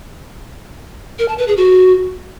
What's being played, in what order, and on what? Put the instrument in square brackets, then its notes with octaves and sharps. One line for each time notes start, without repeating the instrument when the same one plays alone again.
[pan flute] A#4
A5
B4
G#4
F#4